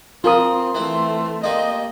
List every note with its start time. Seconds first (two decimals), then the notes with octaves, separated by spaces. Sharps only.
0.24 F3 C4 F4 A#4 C6 D#6
0.75 E3 A3 C4
1.44 G3 A#3 D#4 D#5